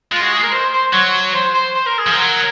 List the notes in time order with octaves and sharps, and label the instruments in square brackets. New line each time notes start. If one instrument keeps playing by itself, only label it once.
[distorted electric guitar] G#3 [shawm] F4
[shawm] F#4
G#4
A#4
C5
C5
[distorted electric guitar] F#3 [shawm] C#5
[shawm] C5
C5
C5
A#4
G#4
[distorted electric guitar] F3
[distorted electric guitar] F#3 [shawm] A#4